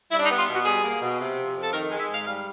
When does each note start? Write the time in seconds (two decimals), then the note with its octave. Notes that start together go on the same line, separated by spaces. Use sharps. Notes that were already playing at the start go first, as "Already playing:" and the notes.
0.11 G3 E4
0.19 D4
0.25 D#4
0.30 B3
0.39 F4
0.48 B2 F#4
0.65 G3 G#4
0.83 A#3
1.01 B2
1.19 C3
1.37 F3
1.55 F2
1.63 A4
1.73 D#3 A#4
1.91 G#3
2.00 E5
2.09 G#2
2.14 F5
2.27 G3 F5